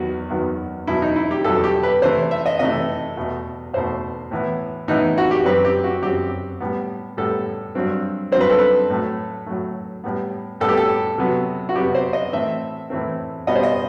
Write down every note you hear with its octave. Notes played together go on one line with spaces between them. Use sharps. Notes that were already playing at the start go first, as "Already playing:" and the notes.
Already playing: E2 D#3 F#3 B3 F#4
E2 D#3 F#3 B3
E2 B2 F#3 E4
D#4
E4
G4
E2 B2 F#3 A4
G4
B4
C3 E3 A3 C5
E5
D#5
C3 E3 A3 D#5
E2 B2 A3
E2 B2 A3 C5
A2 E3 B3
A2 E3 B3 D#4
F#4
G4
F#2 F#3 C4 B4
G4
F#4
F#2 F#3 C4 G4
A2 G3 B3
A2 G3 B3 A4
G2 F#3 C4
G2 F#3 C4 C5
B4
A4
B4
A2 F#3 A3
A2 F#3 A3
A2 G3 B3
A2 G3 B3 A4
G4
A4
C3 F#3 B3
F#4
C3 F#3 B3 G4
C5
D#5
A2 E3 A3 C4 E5
A2 E3 A3 C4
B2 G3 B3 D#5
C5
D#5